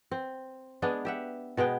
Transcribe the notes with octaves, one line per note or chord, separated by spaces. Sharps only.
C4
G#3 B3 D4
G4 E5 F#5
B2 G#3 B3 G5